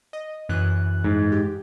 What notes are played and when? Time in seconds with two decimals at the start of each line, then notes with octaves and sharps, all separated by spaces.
0.13 D#5
0.49 F#2 E3 F#6
1.04 G#2
1.32 G4